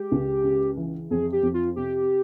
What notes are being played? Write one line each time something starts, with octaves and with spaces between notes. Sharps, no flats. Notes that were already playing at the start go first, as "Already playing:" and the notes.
Already playing: G#3 G4
C#2
C#3
E3
F2 G#4
G4
F2
F4
C3 G4